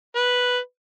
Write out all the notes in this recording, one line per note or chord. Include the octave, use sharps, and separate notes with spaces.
B4